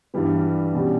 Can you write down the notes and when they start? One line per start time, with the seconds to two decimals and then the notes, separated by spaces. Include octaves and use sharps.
0.14 G2 E3 G3 B3
0.74 B2 G3 C#4 G4